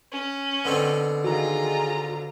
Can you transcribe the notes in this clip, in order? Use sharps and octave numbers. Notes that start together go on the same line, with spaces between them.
C#4
B2 D3 C4
D#3 F4 F#4 G#4 A#5